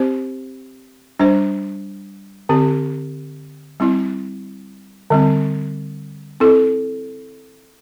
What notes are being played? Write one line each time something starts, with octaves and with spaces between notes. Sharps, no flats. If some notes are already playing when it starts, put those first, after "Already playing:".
Already playing: C4 G4 C5
G3 D4 C5
D3 C4 G4
G3 C4 E4
D3 G3 C4
C4 E4 A4